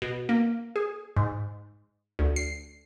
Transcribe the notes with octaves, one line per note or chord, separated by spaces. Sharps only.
B2
A#3
G#4
G#2
D2
C7